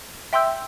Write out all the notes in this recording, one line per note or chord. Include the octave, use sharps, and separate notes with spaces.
E5 G5 C6 E6 G6